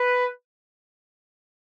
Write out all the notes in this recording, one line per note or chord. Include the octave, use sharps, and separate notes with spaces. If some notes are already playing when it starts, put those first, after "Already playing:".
Already playing: B4